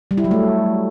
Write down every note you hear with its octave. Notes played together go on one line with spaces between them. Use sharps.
G3
E4
F#3
A3